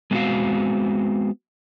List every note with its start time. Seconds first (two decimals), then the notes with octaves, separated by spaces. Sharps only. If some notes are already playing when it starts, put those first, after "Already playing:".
0.11 G#3 B3 C4 F4 F#4 F5